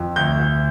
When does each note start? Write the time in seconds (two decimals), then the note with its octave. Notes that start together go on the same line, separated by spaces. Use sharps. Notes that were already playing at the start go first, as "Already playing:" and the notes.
Already playing: F2
0.16 D2 G6
0.40 D2